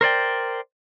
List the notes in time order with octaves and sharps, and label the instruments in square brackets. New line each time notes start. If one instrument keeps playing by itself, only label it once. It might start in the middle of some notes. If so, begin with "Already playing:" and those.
[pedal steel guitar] A#4 C5 D5 G5